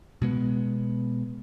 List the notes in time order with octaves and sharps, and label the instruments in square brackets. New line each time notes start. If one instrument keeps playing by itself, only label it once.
[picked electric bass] B2 G#3 B3